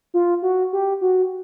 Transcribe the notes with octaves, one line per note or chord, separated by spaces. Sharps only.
F4
F#4
G4
F#4